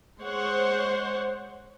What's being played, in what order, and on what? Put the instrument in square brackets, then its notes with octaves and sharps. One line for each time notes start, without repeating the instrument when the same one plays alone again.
[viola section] G#3 C5 C#5 F#5